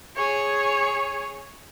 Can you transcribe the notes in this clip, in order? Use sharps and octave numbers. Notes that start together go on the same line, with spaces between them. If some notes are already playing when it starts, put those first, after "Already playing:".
G#4 C#5